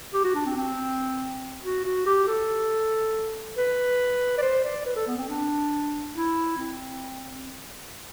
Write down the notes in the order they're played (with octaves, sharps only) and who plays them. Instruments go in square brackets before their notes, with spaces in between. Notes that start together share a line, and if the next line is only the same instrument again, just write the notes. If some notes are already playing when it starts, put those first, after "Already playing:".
[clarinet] G4
F#4
D4
C4
C4
F#4
F#4
G4
A4
B4
D5
C5
D5
B4
A4
B3
C4
D4
E4
C4